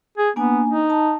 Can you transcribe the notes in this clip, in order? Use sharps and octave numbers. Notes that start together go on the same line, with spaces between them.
G#4
A#3 B3 D4 G#5
D#4
A5